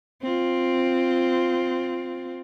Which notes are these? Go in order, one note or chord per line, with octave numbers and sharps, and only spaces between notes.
C4 F4